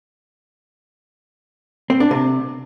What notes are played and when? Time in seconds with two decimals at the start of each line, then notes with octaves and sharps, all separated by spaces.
1.90 C4
2.00 D4
2.11 C3